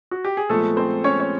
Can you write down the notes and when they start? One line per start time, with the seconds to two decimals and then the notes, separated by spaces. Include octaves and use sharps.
0.11 F#4
0.25 G4
0.37 G#4
0.49 A#2 F3 G#3 A3 B3 A4
0.77 C4 C5
1.04 C#4 C#5
1.20 C#5